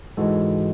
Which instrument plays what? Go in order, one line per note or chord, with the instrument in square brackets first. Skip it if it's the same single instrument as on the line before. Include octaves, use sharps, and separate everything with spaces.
[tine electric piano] G#2 E3 G#3 F#4 A4